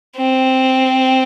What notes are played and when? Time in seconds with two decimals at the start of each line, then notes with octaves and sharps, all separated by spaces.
0.17 C4